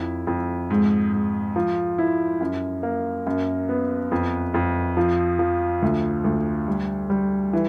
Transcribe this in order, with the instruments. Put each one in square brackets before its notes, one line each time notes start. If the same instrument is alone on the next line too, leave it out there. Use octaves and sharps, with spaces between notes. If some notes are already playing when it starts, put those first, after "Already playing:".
Already playing: [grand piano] F2 E4
F2
G#2
G#2
F3
E4
F#2
A#3
F#2
B3
F2
F2
F3
F3
D2
D2
G3
G3
E3